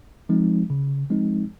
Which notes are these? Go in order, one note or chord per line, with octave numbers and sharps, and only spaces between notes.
F3 G#3 C4 D#4
C#3
F3 G#3 C4 D#4